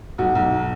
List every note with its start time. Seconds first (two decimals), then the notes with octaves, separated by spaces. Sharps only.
0.18 B1 F#4
0.35 B1